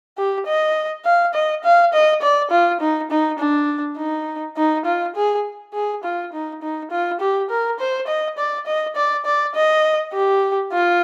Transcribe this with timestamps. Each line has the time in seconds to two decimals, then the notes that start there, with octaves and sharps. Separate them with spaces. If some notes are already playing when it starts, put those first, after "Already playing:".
0.18 G4
0.46 D#5
1.05 F5
1.34 D#5
1.64 F5
1.93 D#5
2.22 D5
2.51 F4
2.80 D#4
3.11 D#4
3.39 D4
3.98 D#4
4.57 D#4
4.85 F4
5.16 G#4
5.74 G#4
6.04 F4
6.33 D#4
6.62 D#4
6.91 F4
7.21 G4
7.50 A#4
7.80 C5
8.08 D#5
8.38 D5
8.67 D#5
8.96 D5
9.25 D5
9.55 D#5
10.13 G4
10.72 F4